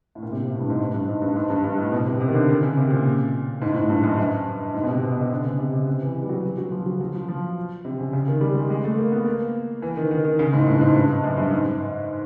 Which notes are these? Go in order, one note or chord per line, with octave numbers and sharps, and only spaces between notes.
A2
A#2
C3
B2
A2
G2
G#2
A2
G2
G#2
G2
G#2
G2
G2
A2
B2
C3
C3
D#3
D3
D#3
C#3
C3
A#2
G#2
A2
G#2
G2
F#2
G2
G#2
B2
C3
B2
C3
D3
C#3
C3
C3
C3
E3
G3
F#3
E3
F#3
F3
F#3
F#3
F3
F3
C3
C#3
C#3
D#3
G3
G#3
G#3
A3
A#3
B3
A#3
E3
D#3
D#3
D#3
C#3
G#2
A2
G2
G#2
G2
F#2
G2
G#2